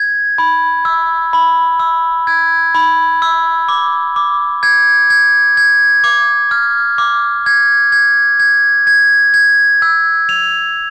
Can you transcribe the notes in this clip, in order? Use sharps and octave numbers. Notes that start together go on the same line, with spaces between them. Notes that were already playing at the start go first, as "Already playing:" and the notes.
Already playing: G#6
B5
E6
B5
E6
G#6
B5
E6
D6
D6
G#6
G#6
G#6
D6
F6
D6
G#6
G#6
G#6
G#6
G#6
E6
F7